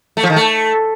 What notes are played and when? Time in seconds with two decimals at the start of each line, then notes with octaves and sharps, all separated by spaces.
0.17 A3
0.23 F3
0.30 D#3
0.36 A3